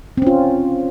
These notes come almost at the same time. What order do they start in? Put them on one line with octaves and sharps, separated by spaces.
C4 C#4 F4